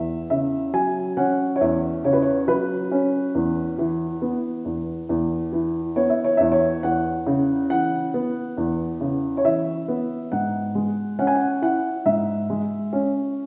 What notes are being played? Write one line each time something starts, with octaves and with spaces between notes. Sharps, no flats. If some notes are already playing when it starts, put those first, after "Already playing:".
Already playing: E2 E5
C#3 E5
F#3 G#5
C#4 F#5
C#5
E2 E5
C#3 C#5
B4
C#5
F#3 B4
C#4
E2
E3
B3
E2
E2
E3
B3 C#5
E5
C#5
E2 E5
C#5
E2 F#5
C#3
E3 F#5
B3
E2
C#3
C#5
E3 E5
B3
G#2 F#5
G#3
C#4 F#5
G#5
F#5
E4 F#5
G#2 E5
G#3
C#4